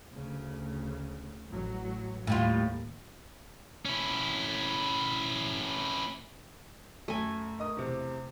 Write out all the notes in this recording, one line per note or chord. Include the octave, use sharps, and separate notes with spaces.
D2 C#3
A1 F#3
D#2 A2 G3 F4
C#4 E4
F#2 A3 G#5
A#4 D#5 D#6
E2 C3